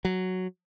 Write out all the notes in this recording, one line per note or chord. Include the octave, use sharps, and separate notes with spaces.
F#3